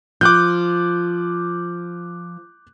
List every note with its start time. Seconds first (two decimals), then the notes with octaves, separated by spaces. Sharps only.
0.21 F3 D6 F#6 G6